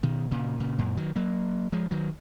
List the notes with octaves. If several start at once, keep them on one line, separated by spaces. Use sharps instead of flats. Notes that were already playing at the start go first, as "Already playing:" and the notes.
B2 D#3
A#2 C#3
A#2 C#3
F#2 A#2
D#3 F#3
F#3 A#3
F3 G#3
D#3 F#3